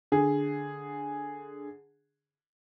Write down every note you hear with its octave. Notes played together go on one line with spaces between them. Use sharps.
D3 G#4